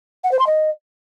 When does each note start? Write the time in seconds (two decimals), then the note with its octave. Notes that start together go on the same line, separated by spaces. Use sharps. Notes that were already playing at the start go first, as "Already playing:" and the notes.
0.24 F#5
0.31 C5
0.39 C6
0.47 D#5